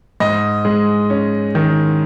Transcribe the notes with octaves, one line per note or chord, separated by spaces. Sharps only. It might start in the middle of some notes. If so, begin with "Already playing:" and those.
G#2 D#5
G#3
C#4
D#3